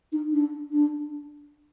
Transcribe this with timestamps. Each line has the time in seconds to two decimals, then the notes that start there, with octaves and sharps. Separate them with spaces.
0.12 D#4
0.32 D4
0.73 D4